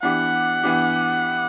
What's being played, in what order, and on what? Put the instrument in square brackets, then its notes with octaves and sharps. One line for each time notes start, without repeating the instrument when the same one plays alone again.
[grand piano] E3 B3 D4 G4 [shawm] F#5
[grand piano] E3 B3 D4 G4